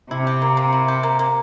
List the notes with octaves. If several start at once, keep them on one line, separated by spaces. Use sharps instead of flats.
C3 E4
G4
A#3
A#3
E4
G4
A#3
A#3